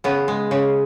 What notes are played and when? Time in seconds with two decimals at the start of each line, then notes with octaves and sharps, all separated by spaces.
0.04 C#3 B3
0.28 G#3
0.51 C#3